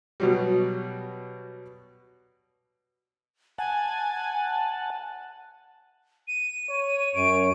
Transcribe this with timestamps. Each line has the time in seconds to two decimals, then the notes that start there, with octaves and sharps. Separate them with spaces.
0.20 B2 F#3 G3
3.59 F#5 G#5 A5
6.28 D#7
6.70 C#5
7.15 F#2 D7